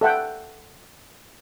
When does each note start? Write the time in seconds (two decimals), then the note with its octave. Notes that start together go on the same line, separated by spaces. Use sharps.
0.01 A4 E5 F#5 G5